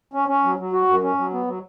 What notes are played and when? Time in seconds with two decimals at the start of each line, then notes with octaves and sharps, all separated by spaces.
0.14 C#4
0.29 C#4
0.44 F#3
0.59 F#3
0.73 F#4
0.88 F#2
1.03 C#4
1.19 F#3
1.33 B3
1.48 F#3